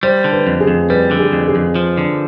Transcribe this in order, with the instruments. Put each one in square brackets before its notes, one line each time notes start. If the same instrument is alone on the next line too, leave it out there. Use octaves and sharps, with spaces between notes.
[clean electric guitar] G3 [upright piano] C5
[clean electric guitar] D3
[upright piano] B4
[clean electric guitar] F2
[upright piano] G#4
[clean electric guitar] F2
[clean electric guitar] G3 [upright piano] B4
[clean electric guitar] D3
[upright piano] G#4
[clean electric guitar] F2
[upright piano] G#4
[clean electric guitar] F2
F3
D3